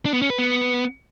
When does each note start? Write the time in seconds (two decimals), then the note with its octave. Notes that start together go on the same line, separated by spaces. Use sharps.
0.05 D4
0.14 B3
0.22 C#4
0.30 B4
0.39 B3